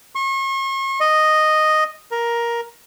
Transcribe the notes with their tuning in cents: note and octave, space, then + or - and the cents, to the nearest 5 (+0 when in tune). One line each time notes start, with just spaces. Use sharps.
C#6 -40
D#5 -5
A#4 +10